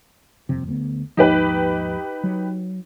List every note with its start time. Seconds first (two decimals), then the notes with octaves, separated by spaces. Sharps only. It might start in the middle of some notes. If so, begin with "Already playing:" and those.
0.49 D#1 F2 C3
0.68 D2 B3
1.17 D#2 G#2 F3 D#4 G4 B4
2.23 F#3